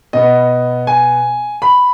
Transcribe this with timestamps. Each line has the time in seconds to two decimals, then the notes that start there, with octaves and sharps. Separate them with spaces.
0.13 B2 B3 D#5
0.87 G#5
1.62 B5